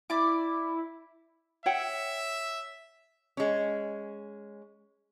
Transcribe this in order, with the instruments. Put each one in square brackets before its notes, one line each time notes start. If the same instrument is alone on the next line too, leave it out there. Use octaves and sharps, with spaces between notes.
[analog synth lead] E4 [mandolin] D5 D6
[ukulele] C#5 F#5 G5 [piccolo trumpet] E5
[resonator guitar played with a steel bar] G#3 C#4